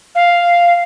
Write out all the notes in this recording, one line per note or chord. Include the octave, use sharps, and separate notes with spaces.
F5